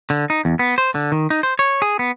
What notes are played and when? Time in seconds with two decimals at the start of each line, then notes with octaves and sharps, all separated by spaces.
0.10 D3
0.30 D#4
0.45 E2
0.59 B3
0.78 C5
0.95 D3
1.12 D#3
1.30 D#4
1.43 C5
1.59 C#5
1.82 G#4
1.99 B3